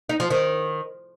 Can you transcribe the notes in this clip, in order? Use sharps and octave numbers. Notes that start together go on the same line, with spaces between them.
D#4
F3
D#3